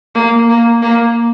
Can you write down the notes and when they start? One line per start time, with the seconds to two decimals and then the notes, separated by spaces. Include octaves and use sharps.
0.15 A#3
0.49 A#3
0.82 A#3